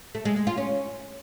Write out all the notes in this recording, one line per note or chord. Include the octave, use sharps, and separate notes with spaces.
A3
G#3
G#3
F4
C#4